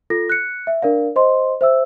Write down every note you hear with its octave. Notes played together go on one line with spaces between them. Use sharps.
F4 A4 A#6
F#6 C#7
E5
D4 A#4 D5 F5
C5 D#5 C6
C5 E5 E6